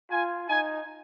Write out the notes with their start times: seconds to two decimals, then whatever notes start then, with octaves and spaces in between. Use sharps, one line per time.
0.11 F4 G#5
0.49 D#4 G#5